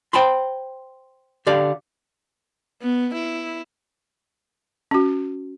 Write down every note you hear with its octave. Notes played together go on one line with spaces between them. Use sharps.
C5 G5 A5 B5 C6
D3 G4 D5 F5
B3
E4
C#4 F#4